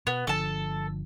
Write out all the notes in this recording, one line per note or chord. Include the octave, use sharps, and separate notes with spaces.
B2 B3
G1 D3 F3 A4 A5